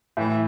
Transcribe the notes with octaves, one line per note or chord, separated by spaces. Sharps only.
A2 E3